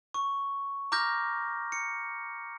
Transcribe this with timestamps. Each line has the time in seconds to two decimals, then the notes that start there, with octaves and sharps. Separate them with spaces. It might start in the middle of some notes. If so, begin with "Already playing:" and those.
0.14 C#6
0.92 A#5 D6 F6 G6 A#6
1.72 C#7